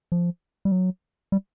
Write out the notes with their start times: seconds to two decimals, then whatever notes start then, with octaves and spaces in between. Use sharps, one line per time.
0.12 F3
0.65 G3
0.72 F#3
1.32 G3